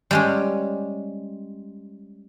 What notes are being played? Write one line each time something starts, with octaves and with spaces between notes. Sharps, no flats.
G3 G#3 C#4